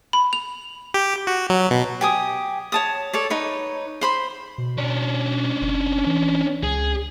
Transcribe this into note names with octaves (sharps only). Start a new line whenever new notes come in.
B5
F7
G4
F#4
F#3
B2
G4 G#5 D#6
C#5 A5 D#6
A4 C#5 D5
D#4 B4 C#5
C5 B5 C6
B2
C#4 D4
F#1
E3
C#2 G#4